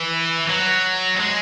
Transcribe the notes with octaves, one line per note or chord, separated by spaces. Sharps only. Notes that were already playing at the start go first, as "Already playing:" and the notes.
Already playing: E3
F#3
G#3